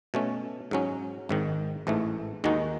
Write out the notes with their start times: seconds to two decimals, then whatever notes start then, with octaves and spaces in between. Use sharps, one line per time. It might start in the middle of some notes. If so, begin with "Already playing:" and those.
0.14 B2 A3 C#4
0.71 G#2 F#3 C#4
1.29 G#1 G#2 D#3
1.87 A1 G#2 E3 A3
2.44 D#2 D#3 G#3 D#4 F#4